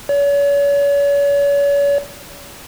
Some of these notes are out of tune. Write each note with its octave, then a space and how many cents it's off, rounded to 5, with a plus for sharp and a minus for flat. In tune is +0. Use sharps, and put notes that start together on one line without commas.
C#5 +40